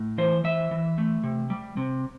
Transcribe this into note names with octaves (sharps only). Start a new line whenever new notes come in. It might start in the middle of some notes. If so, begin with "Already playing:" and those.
Already playing: A2
E3 C5
E3 E5
E3
A3
C3
G3
C3